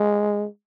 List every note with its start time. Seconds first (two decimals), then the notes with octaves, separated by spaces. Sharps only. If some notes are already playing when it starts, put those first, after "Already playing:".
Already playing: G#3